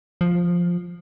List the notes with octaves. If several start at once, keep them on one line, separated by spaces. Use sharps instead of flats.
F3